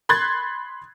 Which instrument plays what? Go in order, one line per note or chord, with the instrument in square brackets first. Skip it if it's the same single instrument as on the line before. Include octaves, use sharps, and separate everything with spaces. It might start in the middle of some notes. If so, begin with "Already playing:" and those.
[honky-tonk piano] B5 C6 F#6 G#6 A6